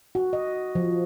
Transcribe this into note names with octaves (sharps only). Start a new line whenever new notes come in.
F#4
D#5
F3